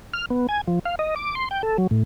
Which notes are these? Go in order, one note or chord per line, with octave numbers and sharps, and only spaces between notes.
F6
B3
G#5
F3
F5
D#5
D6
C6
G5
A4
F#3
A2